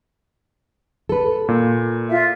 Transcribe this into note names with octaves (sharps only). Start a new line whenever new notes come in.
A4 B4
A#2
F4 E5